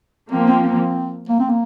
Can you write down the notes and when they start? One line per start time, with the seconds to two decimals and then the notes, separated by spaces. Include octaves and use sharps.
0.31 F3 A#3 C4
0.48 C4
0.64 C4
1.29 A#3
1.40 C4
1.49 A#3